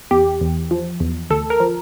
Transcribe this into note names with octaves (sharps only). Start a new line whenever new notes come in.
E2 G4
E2
F3
E2
D2 A4
A#4
F3